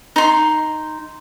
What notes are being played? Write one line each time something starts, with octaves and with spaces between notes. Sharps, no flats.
D#4 C6